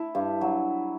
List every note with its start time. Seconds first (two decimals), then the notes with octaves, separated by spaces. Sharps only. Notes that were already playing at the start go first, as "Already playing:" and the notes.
Already playing: E4
0.15 G2
0.41 F#3